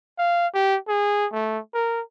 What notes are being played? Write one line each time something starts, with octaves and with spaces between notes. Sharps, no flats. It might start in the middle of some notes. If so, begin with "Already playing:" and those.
F5
G4
G#4
A3
A#4